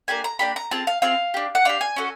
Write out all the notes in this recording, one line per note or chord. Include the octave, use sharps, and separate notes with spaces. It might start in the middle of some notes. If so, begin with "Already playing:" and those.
A#3 D4 G4 G#5
A#5
A#3 D4 G4 B5
A#5
C4 F4 G#4 A5
F5
C4 F4 G#4 F5
D4 G4
F#5
D4 G4 F5
G#5
C#4 F#4 A4